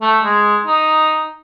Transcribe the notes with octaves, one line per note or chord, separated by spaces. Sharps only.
A3
G#3
D#4